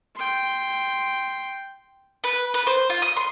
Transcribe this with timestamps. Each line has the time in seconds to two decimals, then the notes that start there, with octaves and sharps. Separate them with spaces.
0.15 G5 C6
2.24 B4
2.54 B4
2.67 C5
2.90 F4
3.02 D#6
3.17 C6